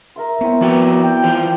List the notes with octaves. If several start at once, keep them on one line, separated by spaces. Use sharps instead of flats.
A#4 E5 C6
B3 C4 E4 C#5
F3 F#4 A#4 B4 D5 G5
G5
E3 F4 C5